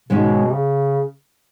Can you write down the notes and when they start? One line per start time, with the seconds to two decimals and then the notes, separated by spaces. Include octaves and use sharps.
0.09 G#2 B2 D#3 G#3 C#4
0.54 C#3